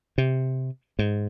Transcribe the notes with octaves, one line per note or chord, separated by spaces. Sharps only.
C3
G#2